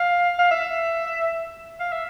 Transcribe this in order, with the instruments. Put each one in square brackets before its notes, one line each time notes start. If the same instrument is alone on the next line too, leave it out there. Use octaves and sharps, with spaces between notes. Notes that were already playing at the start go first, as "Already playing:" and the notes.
Already playing: [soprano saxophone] F5
F5
E5
F5
E5